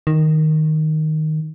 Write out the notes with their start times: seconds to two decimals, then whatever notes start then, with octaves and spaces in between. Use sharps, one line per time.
0.07 D#3